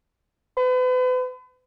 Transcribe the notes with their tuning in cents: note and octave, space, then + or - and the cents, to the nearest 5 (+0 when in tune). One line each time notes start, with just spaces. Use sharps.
B4 +40